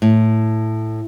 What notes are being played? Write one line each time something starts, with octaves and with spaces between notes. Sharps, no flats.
A2